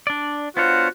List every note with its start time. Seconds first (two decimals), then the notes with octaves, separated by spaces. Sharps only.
0.07 D4 D5
0.57 B3 D4 F4 F#4 C5 C#5